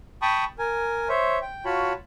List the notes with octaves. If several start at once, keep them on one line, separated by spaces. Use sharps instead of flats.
G5 A5 B5 C#6 D#6
A#4 G#5
C5 C#5 E5
G5
F4 F#4 C#5 A5 B5